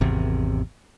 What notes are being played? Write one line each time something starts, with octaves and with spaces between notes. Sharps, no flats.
G#1 E2 C3